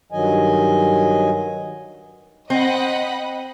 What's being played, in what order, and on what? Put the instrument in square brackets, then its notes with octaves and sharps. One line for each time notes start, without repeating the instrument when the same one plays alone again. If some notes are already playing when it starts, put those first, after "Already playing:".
[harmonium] G2 D#3 F#3 D#5 G#5
[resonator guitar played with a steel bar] C4 [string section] D#5 F#5 B5